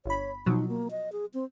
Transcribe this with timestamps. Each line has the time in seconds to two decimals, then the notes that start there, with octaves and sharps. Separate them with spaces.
0.06 G1 C#5 B5
0.46 B2 F3 F#3 D#4
0.68 A#3
0.91 D#5
1.12 G#4
1.34 C4